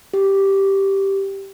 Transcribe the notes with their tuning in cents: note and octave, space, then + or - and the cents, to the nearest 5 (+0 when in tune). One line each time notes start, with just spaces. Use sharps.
G4 -5